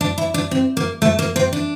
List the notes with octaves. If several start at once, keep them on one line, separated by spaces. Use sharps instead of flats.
D4
E4
D4
C4
A#3
A3
A#3
C4
D4